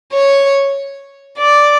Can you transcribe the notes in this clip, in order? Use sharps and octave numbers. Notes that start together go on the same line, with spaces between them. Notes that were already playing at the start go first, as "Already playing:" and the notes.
C#5
D5